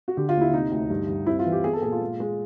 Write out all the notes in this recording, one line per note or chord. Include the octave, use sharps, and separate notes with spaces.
F#4
D3 G4
F4
D#2
E4
C3 D#4
D2
G2
G2
C4 E4
F4
E3
G4
B3 G#4
A4
A#2 G#4
F4
G#3
G#3